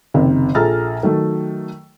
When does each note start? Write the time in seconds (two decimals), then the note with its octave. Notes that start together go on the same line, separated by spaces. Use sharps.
0.14 F#1 C3 D#3
0.55 A#1 G#4 A4 A#5 F6 A6
1.03 D#3 F#3 A3